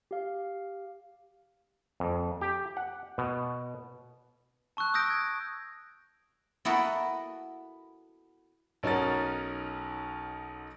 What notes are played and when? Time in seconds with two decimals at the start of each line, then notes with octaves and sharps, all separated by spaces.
0.11 G4 F5
2.00 F2
2.41 G4
2.77 F#5
3.18 B2
4.77 A5 C#6 E6 F#6
4.94 D#6 E6 G6 A#6 D7
5.10 G#6
6.65 B3 E4 F#4 A4 A#4
8.83 B1 C#4 D#4 F#4 A#4 A6